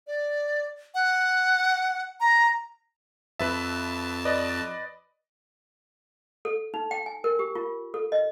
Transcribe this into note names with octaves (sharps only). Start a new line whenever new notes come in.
D5
F#5
A#5
F2 B4 E5 A5
B4 D5 D#5
A4
D#4
G5
G#5
A#4
G4
F4
A4
D#5